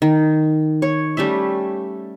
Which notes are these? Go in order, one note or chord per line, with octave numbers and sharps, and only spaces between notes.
D#3
C#5
G3 A3 C#4 E5